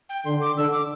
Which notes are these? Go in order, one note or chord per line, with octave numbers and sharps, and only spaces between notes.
G5
D3 C6
D6
D3 E6
D6